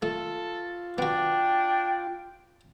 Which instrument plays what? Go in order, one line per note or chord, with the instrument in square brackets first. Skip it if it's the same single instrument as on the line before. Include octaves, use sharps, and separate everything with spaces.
[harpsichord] A3 [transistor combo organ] F4 [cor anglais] A4
[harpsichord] B3 F#4 [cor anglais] D4 [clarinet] G5